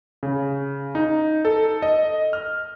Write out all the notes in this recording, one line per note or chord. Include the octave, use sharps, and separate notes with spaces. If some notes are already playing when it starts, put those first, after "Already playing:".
C#3
D#4
A4
D#5
F6